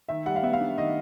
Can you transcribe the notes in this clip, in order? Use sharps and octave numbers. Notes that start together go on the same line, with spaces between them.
D#3 E5
G3 F#5
F5
B3 E5
F5
D4
D#3 D#5